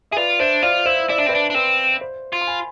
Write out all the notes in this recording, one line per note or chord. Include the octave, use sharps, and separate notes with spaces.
G#4 E5
F4 B4 D5
D4 C5 E5
F4 D5 F5
E4 C5 E5
E4 D5
D4 E5
C4 B4 D5
D4
D4
C4 B4
C5
F4
C6
G#5 B5